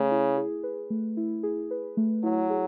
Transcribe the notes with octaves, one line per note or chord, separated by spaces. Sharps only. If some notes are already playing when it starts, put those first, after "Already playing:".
Already playing: C#3 A3
E4
G#4
B4
A3
E4
G#4
B4
A3
F#3 E4
G#4